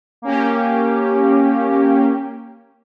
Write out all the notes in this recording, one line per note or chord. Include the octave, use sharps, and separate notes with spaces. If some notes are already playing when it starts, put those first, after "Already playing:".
A#3 C#4 G4